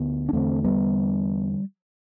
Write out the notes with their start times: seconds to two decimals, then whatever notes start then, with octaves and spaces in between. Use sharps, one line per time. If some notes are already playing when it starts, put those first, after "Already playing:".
Already playing: D2 D3 B3
0.29 D4
0.33 E2 D3 A3 C4
0.65 G3 B3